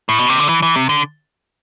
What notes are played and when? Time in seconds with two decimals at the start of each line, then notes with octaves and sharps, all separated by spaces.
0.09 A2
0.19 B2
0.29 C3
0.39 D3
0.49 E3
0.62 E3
0.76 C3
0.89 D3